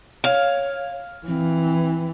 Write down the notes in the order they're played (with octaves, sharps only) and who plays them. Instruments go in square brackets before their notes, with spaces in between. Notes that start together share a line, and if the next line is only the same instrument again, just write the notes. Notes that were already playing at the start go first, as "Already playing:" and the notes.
[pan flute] C#5 [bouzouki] F5
[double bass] E3 [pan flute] C4